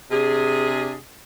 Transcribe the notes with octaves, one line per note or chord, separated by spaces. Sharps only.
C3 D4 G#4